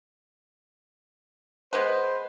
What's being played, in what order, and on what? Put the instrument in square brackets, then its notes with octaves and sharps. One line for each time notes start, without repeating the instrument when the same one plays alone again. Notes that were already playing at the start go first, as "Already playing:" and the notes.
[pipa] G#3 B3 B4 [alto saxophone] C5